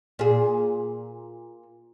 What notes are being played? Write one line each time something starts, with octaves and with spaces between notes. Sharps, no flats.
A#2 G#4